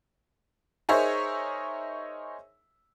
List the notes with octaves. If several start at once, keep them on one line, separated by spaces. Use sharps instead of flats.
D#4 G#4 A#4 C5 C#5 E5